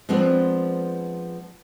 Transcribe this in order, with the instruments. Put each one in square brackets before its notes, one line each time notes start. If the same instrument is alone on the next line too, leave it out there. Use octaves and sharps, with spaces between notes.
[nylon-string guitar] F3 G#3 B3 C4 D4